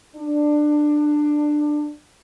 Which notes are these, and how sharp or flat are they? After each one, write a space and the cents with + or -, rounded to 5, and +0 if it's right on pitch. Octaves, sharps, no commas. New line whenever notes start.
D4 +15